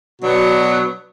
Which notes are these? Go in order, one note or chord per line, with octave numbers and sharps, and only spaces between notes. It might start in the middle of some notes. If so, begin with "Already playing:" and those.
B2 F#3 B3 D4 F#4